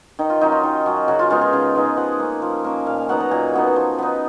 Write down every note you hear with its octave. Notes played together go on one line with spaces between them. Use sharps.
D#3 D#4
F4
F#3 C#4 D#4
F4
D#3
F#3 C#4
C#3 F#4
F4
G#3 B3 D#4 F4
G#4
C#3
G#3 B3 D#4
F3 F#5
A#3 C#4
F3
A#3 C#4
A#2 F5
F5
F#3 B3 D#4 F#5
A#5
A#2 G#5
F#3 B3 D#4
F3
B3 D#4